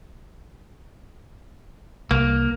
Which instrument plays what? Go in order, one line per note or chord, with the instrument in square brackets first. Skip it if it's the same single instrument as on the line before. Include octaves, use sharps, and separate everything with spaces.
[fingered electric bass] C2 [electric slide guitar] A#3